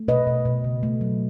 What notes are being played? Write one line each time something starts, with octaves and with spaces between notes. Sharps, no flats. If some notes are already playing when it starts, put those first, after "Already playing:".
Already playing: A3
B2 B4 D#5
B2
B2
C#3
A3
F#3